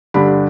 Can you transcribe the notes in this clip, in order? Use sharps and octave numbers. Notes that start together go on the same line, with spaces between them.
G2 D3 G3 D4 B5